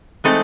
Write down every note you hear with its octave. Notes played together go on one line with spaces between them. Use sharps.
E3 G#3 A3 C4 D#4 A4